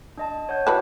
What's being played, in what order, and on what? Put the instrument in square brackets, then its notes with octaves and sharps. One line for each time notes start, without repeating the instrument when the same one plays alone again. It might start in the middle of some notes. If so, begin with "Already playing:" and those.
[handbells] D4 D#5 A5
C#5 F#5 G6
[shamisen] E3 B4 A5 [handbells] F#4